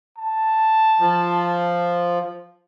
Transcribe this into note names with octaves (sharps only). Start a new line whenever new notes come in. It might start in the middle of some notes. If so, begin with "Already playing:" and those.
A5
F3